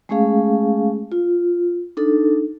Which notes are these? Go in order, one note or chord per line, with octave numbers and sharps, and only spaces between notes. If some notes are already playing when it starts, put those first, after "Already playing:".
G#3 A3 C#4 G#4 F5
F4
D4 D#4 A4